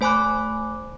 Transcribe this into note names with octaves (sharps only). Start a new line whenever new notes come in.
A3 C5 G#5 B5 D6 F#6